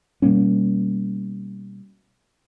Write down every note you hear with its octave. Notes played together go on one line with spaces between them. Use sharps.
B2 G3 A#3 C#4